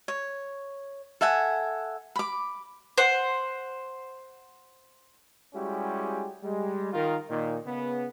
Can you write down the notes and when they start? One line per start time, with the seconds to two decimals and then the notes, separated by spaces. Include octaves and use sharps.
0.08 C#5
1.21 A4 E5 F#5 G#5
2.16 B5 D6
2.98 C5 F#5
5.54 G3 G#3 C#4 E4 F#4 G4
6.42 G3 G#3
6.93 D#3 F4 A#4
7.30 A#2 D#3 D#4
7.65 C#3 B3